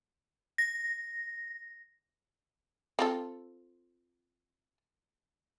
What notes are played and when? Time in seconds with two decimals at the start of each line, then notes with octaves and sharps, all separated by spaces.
0.58 A#6
2.99 C4 F4 A4